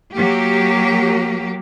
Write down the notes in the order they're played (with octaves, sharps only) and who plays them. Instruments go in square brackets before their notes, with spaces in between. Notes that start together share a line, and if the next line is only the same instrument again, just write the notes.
[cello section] F#3 A#3 G4